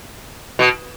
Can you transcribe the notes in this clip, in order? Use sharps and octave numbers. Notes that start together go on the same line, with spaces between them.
B2